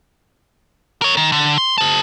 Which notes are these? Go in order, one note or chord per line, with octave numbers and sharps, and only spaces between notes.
A#4 C#5
D#3
D3
C6
G#4 A5